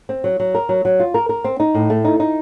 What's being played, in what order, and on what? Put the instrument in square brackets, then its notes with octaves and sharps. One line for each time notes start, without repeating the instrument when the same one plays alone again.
[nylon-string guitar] C4
F#3
F#3
A#4
F#3
F#3
F4
A#4
A#4
C4
D#4
A2
A3
D#4
D#4